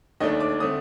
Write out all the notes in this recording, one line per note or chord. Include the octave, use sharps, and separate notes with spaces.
D#2 D#3 A3 D4 D#5
D6
D3 A3 C4 D#6